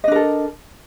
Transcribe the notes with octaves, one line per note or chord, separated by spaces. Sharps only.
D4 A4 A#4 D#5